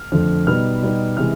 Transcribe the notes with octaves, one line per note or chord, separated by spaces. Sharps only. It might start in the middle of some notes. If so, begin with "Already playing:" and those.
Already playing: F6
F2 D3 F3 A3
B2 G3 B3 D#4 F6
B2 G3 B3 D#4
C3 E3 G#3 F6